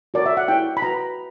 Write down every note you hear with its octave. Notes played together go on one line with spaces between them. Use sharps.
F#4 A#4 C#5 D5
E5
F#5
E4 G4 C#5 G5
B5
F#4 B4 A#5